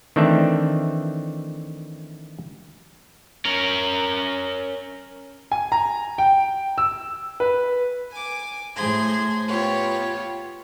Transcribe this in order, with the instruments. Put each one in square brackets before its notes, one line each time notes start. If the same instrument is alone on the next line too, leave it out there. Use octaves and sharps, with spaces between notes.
[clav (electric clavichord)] D#3 E3 A3 C4 D4 E5
[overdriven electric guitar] C#4 A#4
[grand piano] G#5
A#5
G5
E6
B4
[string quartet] G#5 D6
A2 G#4 C5 C6 G#6
B3 F4 G4 C#5